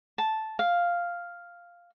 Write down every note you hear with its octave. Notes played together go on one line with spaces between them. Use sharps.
A5
F5